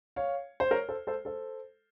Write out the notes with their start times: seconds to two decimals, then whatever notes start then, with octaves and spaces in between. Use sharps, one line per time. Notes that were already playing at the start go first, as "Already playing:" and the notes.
0.16 C#5 F5
0.60 C5
0.71 A#4 C#5
0.88 A4 C5
1.07 A4 C5
1.25 A4 C5